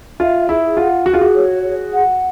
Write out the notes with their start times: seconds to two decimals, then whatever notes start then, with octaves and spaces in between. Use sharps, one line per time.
0.20 F4 E5
0.49 E4 G#4
0.77 F4 F#5
1.06 F#4 G#4
1.14 F4
1.21 F#4
1.35 C#5
1.63 G#4
1.93 F#5